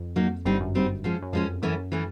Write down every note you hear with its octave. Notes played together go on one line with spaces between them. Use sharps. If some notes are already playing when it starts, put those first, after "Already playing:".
Already playing: F2
F#3 A#3 D#4
G1 G2 G3 C4 D#4
F#2
G3 C4 D#4
F3 G#3 C#4
F#2
F2 F3 G#3 C#4
F#2 E3 A3 C#4
E3 A3 C#4